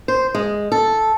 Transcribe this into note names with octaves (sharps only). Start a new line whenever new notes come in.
C5
G#3
A4